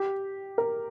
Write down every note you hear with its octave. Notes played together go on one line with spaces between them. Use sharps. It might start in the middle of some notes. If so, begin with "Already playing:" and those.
Already playing: G4
A#4